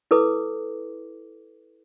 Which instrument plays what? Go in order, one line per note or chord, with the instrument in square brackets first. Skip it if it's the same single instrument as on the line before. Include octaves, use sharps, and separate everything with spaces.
[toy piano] E4 A4 B4 D6